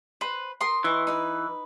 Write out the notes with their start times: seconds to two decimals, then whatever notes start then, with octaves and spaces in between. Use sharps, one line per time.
0.21 B4 C5
0.61 A#4 C6 D#6
0.84 E3 E4 C#5 D#5
1.07 D#4 B4